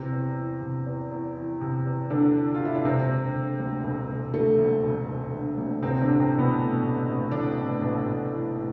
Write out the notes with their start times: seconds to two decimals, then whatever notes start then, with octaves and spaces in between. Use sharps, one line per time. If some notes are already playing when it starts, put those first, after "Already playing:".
Already playing: E2 C3 C4
0.12 E2
0.37 E3
0.61 C3
0.86 E2
1.11 E2
1.36 E3
1.61 C3
1.86 E2
2.10 E2 D3 D4
2.35 E3
2.54 F4
2.60 C3
2.65 E4
2.75 D4
2.85 E1 C3 C4
3.10 E1
3.34 D3
3.60 D2
3.84 E1
4.09 E1
4.34 D3 A3
4.59 D2
4.83 E1
5.08 E1
5.33 D3
5.58 D2
5.82 A1 C3 C4
6.01 D3 D4
6.07 A1
6.20 C3 C4
6.32 E3
6.38 B2 B3
6.57 A2
6.81 A1
7.06 A1
7.31 D3 E3 D4
7.57 A2
7.82 A1
8.06 A1
8.31 E3
8.55 A2